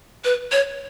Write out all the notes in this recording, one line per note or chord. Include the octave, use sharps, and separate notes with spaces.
B4
C#5